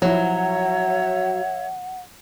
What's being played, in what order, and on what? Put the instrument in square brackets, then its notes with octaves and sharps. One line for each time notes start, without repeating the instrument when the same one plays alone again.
[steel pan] F3 E4 [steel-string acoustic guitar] F#3 [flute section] C#5 E5 [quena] F#5